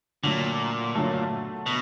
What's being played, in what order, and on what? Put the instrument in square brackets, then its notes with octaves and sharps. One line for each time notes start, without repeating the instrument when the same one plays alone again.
[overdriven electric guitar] A#2 [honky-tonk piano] D3 F#3 A3
[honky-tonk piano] D3 F#3 A3
[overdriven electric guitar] B2